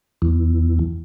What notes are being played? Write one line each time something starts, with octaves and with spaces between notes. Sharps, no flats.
E2